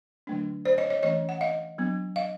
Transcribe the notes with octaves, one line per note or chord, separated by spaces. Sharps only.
D3 F#3 A3 D4
C5 D5
C#5 D#5
C#5 D#5
E3 A3 C#4 C#5 D#5
F#5
D#5 F5
F#3 B3 D4
D#5 F5